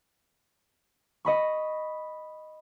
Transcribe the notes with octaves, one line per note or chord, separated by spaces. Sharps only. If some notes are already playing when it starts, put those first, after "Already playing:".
D#5 B5 C#6